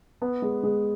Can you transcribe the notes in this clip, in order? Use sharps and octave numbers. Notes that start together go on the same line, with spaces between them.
B3
G#3
G#3